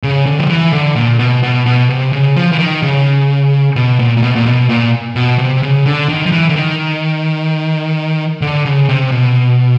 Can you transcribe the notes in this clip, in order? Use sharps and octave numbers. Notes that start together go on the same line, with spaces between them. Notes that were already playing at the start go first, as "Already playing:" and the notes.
C#3
D3
F3
E3
D3
A#2
B2
B2
B2
C3
C#3
F3
E3
D#3
C#3
B2
A#2
A#2
B2
A#2
B2
A#2
B2
C3
C#3
D3
D#3
F3
E3
D3
D#3
D3
C#3
C3
B2